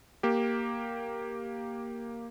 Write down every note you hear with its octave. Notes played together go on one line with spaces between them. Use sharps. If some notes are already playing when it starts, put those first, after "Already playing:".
A#3 G4